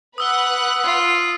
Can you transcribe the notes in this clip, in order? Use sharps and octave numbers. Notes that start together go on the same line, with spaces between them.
B4 F#5 D#6 E6 F#6 G7
F4